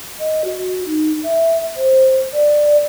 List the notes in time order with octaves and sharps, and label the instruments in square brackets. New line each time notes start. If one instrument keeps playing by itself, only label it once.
[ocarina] D#5
F#4
D#4
E5
C5
D5